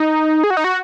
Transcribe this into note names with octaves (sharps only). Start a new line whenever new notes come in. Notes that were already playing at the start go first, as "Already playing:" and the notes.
Already playing: D#4
G#4
F#4
D#4
F#4